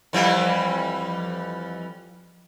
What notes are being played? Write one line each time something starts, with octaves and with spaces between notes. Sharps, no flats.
F2 E3 G3